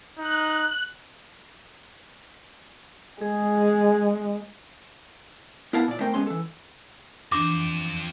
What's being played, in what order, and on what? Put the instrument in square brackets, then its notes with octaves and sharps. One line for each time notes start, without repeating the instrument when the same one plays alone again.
[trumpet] D#4 [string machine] F#6
[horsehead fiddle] G#3 [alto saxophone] G#4
[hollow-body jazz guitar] B3 E4 A#4 F5 F#5 A5
A#2 D5
A3 C4 A#4 G5
G#3 B3 C#4 C6
E3 A4
[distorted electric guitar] F2 C5 [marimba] E3 D4 A#6 [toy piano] D6